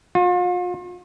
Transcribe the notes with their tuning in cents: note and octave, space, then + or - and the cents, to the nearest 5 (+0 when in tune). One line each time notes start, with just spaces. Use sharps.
F4 +40